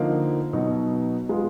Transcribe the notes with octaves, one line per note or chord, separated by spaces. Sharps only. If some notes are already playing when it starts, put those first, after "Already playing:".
Already playing: D3 F3 A#3 D#4
B2 F#3 B3 D#4 F#4
G#3 B3 F4